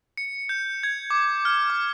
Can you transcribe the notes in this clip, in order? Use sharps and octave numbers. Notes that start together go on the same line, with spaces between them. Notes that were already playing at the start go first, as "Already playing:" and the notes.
C#7
G6
G#6
D6
F6
D6